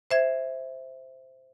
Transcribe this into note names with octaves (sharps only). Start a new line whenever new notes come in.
C5 E5 G#6